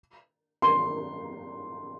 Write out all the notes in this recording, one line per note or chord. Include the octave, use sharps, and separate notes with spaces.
C6